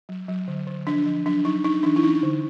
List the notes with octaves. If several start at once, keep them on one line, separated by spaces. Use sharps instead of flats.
F#3
F#3
D3
D3
F3 D4
F3
F#3 D4
F#3 D#4
D4 D#4
E3 D4
E4
C#4 D#4
D3